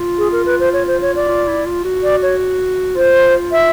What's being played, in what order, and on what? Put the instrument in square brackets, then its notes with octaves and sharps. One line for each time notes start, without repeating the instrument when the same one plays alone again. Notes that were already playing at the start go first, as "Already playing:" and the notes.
Already playing: [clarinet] F4
[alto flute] G#4
A#4
B4
C5
C#5
C5
C#5
D5
[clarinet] F4
E4
F4
F#4
[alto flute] D5
C#5
[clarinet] F4 [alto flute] C5
[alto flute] E5